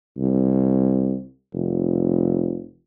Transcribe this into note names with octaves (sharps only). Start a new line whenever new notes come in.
C2
F1